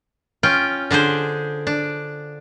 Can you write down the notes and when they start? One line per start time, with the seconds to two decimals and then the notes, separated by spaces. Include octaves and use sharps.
0.43 C#4 F4 G5
0.91 D3 D4 G#4 C5
1.67 D4